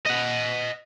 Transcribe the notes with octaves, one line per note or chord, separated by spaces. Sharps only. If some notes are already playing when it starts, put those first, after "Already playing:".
D#5 F#5